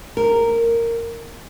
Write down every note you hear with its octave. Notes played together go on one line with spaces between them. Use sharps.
A#4